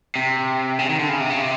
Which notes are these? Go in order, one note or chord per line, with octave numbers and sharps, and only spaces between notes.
C3
C#3
D#3
D3
C#3
C3
C#3
C3